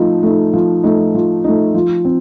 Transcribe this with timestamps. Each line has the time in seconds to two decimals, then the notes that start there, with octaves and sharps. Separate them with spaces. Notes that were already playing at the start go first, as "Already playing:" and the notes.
Already playing: F3 A3 D#4
0.23 A3 D#4
0.53 F3
0.83 A3 D#4
1.15 F3
1.44 A3 D#4
1.74 F3
2.05 C4